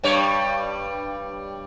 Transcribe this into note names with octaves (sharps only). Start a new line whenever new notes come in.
G2 G3 C#5